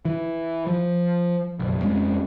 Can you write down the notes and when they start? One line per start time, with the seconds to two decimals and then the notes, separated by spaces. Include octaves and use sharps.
0.05 E3
0.67 F3
1.59 F#1 B1
1.82 F2 G#3 C4 C#4